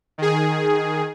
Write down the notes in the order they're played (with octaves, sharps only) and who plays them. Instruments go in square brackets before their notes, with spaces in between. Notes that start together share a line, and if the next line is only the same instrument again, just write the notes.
[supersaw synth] D#3 G#4